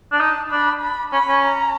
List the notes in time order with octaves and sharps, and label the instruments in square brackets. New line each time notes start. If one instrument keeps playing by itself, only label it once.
[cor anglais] D4
[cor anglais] D#4 [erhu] A5
[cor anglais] D4 [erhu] B5
[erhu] B5
[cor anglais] C#4 [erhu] B5
[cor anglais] C#4
[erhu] A#5